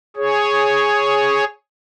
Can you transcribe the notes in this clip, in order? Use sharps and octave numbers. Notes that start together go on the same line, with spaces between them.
G#4 C#5